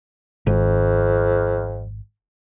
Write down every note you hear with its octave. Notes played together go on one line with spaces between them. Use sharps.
G#1 F2